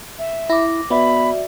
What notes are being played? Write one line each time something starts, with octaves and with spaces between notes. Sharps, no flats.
E5
E4 D6 A#6
B3 F#4 D5 E5 B5